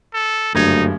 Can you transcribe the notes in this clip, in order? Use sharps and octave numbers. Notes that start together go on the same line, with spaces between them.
A4
F#1 D2 G2 D#4 G#6